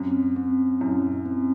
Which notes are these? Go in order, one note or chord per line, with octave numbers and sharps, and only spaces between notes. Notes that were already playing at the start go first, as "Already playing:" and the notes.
Already playing: F#2 C4
C4
F#2 E4
C4